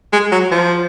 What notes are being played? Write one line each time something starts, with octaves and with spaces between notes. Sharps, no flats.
G#3
F#3
F3